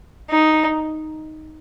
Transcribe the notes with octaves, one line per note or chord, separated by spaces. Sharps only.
D#4